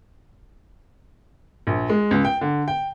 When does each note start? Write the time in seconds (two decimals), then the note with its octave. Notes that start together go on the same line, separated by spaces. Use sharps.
1.67 A#1
1.89 G#3
2.11 C#2
2.25 G5
2.41 D3
2.68 G5